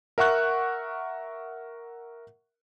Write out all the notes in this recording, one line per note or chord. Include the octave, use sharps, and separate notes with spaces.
A#4 E5 F#5 C#6 F#6